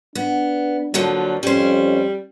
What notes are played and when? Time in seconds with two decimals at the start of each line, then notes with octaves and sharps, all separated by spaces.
0.15 B3 D4
0.94 A#2 D3 F3 F#3
1.43 F2 G3 C#4 C5